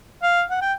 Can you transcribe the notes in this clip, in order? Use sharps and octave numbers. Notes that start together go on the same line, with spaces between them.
F5
F#5
G5